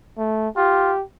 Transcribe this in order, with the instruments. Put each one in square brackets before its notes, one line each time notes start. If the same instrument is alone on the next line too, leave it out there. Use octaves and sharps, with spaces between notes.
[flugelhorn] A3
[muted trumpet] F4 [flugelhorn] G4